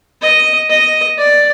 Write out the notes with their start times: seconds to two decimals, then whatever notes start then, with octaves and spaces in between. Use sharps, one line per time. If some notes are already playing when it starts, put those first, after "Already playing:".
0.22 D#5
0.70 D#5
1.18 D5